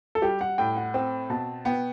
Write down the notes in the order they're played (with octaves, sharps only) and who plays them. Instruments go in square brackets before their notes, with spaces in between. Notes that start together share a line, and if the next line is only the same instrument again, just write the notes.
[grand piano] A4
[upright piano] G3 [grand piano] G4
[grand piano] F#5
[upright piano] A2 [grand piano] G5
[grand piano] F#5
[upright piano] C4 [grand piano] G5
[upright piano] B2 [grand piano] A5
[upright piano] B3 [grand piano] G5